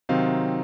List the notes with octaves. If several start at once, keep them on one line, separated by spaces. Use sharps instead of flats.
C3 D#3 F#3 C4 D#4 F5